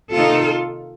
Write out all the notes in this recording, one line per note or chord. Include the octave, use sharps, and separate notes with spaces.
C3 D#3 A#3 D#4 F4 A4